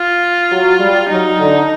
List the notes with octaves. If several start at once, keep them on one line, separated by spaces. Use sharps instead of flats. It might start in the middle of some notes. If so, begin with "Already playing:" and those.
Already playing: F4
F#3
G3
F#3 D#4
D3